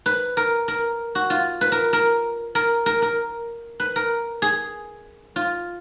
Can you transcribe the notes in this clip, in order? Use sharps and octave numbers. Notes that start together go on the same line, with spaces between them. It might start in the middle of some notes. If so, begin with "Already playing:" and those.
B4
A#4
A#4
F#4
F4
B4
A#4
A#4
A#4
A#4
A#4
B4
A#4
G#4
F4